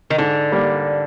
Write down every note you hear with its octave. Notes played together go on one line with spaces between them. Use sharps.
D#3
G#2 D3
G3 A#3